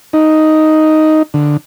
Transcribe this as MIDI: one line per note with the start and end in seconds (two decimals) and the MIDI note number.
0.13 1.23 63
1.34 1.57 50